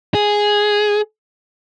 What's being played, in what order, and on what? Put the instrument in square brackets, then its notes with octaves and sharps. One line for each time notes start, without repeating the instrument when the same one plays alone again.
[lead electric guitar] G#4